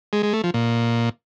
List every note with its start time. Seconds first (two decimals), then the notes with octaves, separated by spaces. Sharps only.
0.13 G#3
0.23 G#3
0.33 A3
0.44 F3
0.54 A#2